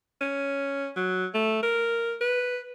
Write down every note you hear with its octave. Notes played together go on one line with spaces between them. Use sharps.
C#4
F#3
A3
A#4
B4